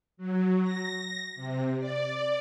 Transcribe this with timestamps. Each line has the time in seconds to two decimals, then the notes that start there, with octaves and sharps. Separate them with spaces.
0.17 F#3
0.62 A#6
1.36 C3
1.79 D5